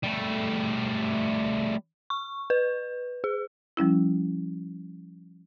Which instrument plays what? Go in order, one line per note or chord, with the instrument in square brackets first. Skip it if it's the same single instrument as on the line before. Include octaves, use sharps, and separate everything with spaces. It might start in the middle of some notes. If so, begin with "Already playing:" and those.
[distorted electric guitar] G3 A3
[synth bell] C#6
B4
G#4
[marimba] F3 G3 C#4 E4